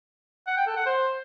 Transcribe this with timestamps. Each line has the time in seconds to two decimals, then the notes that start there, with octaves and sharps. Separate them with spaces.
0.47 F#5
0.57 G5
0.67 A4
0.76 F#5
0.86 C5